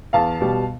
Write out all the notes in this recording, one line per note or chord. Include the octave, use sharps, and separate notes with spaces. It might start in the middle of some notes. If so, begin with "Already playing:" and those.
E2 F5 A5
B2 G3